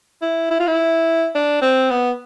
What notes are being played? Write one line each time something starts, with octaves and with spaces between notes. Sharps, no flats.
E4
E4
F4
E4
D4
C4
B3